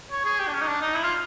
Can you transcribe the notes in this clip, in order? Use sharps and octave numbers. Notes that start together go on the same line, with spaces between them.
C#5
G#4
G4
D4
C#4
D#4
D4
D#4
E4
F4